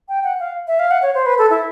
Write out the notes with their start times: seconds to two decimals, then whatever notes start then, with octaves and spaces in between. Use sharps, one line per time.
0.09 G5
0.24 F#5
0.40 F5
0.68 E5
0.79 F5
0.91 F#5
1.02 C#5
1.15 C5
1.26 B4
1.38 A4
1.50 E4